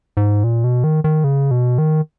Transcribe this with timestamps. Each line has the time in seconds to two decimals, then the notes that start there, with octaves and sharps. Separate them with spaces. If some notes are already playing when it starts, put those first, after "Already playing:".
0.17 G#2
0.44 A#2
0.64 B2
0.84 D#3
1.04 D#3
1.24 C#3
1.51 B2
1.78 D#3